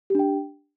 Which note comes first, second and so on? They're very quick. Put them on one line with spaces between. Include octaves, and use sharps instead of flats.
G4 D4 G5